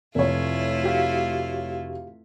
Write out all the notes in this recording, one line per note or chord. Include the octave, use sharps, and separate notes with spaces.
F1 A3 E4 F4 C#5
F#4 G4 F5